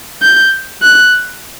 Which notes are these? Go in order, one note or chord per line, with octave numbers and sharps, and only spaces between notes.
G6
F#6